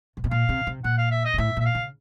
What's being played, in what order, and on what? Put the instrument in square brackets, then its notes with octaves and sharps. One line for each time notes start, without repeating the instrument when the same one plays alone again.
[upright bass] C3
B2
[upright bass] A#2 [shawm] F5
[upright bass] C3
C3
[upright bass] A#2 [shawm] F#5
[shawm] F5
E5
D#5
[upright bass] A#2
[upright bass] A2 [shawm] E5
[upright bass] A#2 [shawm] E5
[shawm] F5
[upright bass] C#3